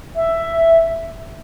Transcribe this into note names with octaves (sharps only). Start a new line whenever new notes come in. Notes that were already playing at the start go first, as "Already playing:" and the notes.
E5